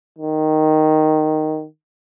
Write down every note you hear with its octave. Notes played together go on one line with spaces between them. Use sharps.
D#3